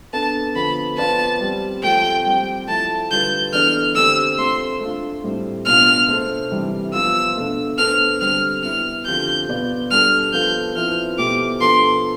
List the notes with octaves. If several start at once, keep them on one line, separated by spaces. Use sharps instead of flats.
B3 D4 A4 A5
D3 F3 B3 B5
F3 B3 F4 B4 D5 A5
G3 C4 G4
F3 A3 C4 G5
G3 C4 G4
F3 A3 E4 A5
D3 G3 D4 F4 B4 G6
E3 B3 D4 A4 D5 F6
D3 A3 C4 G4 C5 E6
A3 C4 F4 C5 C6
A3 D4 F4
A2 G3 C4
B2 B3 D4 F4 F6
A3 D4 A4 C5
C3 E3 G3
F3 B3 F4 E6
B2 A3 D4 F4
B3 D4 A4 C5 F6
D3 G3 C4 F6
B3 E4 B4 F6
D3 F3 C4 G4 G6
B2 B3 F4 B4 D5
G3 D4 A4 F6
F3 B3 F4 A4 G6
F3 C4 E4 B4 F6
B2 A3 E4 G4 C5 D6
F3 B3 D4 A4 C6